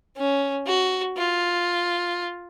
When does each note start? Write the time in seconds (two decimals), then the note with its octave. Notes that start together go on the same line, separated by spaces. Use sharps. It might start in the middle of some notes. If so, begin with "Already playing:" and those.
0.17 C#4
0.67 F#4
1.18 F4